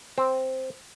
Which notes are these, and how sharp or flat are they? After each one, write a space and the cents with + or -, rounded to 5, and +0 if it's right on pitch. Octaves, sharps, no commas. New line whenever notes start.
C4 +0 C5 +0